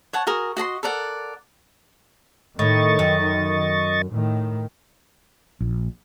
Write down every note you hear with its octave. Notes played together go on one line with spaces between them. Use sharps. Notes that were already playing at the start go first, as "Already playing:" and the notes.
C#5 F#5 A5
F#4 G#4 A#4
F#4 D#5 A5 C6
A4 A#4 D5 F#5
A2 D#3 D#5 C#6 A6
F#2
A2 D#3
A#1